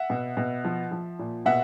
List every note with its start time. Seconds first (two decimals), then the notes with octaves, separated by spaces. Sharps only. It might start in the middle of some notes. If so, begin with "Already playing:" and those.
Already playing: E5 F#5
0.10 B2
0.37 B2
0.64 F3
0.91 F3
1.19 A#2
1.46 B2 E5 F#5